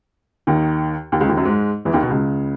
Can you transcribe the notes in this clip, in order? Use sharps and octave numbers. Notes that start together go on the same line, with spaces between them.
D#2 D#3
D#2 D#3
C#2 C#3
D#2 D#3
F#2 F#3
G#2 G#3
E2 E3
D#2 D#3
B2
C#2 C#3